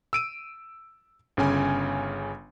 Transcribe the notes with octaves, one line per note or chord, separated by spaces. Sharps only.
E6 D7 D#7
G1 C#3 C#4 G#5